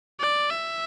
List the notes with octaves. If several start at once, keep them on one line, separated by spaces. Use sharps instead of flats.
D5
E5